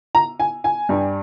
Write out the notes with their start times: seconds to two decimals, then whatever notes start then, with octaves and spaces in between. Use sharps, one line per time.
0.15 A#5
0.40 G#5
0.64 G#5
0.89 G2 G3